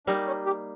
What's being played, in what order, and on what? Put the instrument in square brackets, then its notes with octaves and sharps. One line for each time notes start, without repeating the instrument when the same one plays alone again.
[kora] G3 A#3 D#4 [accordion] D4
[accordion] C#4
G4